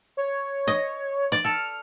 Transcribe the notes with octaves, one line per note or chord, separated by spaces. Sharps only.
C#5
D#5
D5
A4 F6